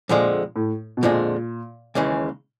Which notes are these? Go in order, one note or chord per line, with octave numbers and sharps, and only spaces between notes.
F2 A#2 D3 F3 G#3
A2
B2
F2 A#2 D3 F3 G#3
D#2 C#3 E3 G#3